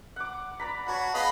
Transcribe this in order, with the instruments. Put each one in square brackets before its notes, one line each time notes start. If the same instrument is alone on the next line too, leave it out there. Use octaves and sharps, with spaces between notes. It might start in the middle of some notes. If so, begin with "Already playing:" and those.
[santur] F#5 D6
D5 A#5 B5
[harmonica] F#4 [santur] C#5 A5 B5
[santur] B3 G#4 [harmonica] D#5 F5 B5